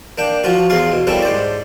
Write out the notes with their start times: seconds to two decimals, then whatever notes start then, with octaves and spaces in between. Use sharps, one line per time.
0.18 A#3 D4 G5
0.44 F3 F4 F#4
0.70 E2 F4 G#4 F5 C6
0.92 B2
1.07 G3 A#3 C4 C#4 E4 A4
1.22 G#2 C5 D5